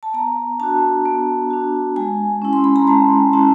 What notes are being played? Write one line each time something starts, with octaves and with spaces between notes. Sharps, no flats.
A5
B3 A#5
D4 F#4 A5
B3
D4 F#4
G#3 G#5
C#4 E4
C6
B5
A#5
G#3 A5
C#4 E4 A5